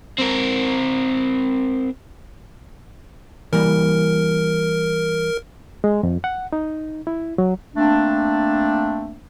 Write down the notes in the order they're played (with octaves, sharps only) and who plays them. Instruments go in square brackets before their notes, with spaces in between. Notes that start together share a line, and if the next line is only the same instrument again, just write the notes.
[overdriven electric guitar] C4 A#4
[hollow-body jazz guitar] E3 G3 A#3 [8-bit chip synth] A#4
[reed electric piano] G#3
F2
F#5
D#4
E4
F#3
[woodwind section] A3 A#3 C4 D4